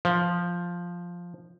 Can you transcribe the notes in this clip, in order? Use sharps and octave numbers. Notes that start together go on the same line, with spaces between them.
F3